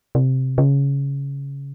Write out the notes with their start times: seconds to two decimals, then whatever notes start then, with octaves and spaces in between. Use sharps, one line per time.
0.15 C3
0.58 C#3